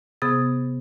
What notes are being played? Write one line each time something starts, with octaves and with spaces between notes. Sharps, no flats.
C3 B3 G#4 D#6 A6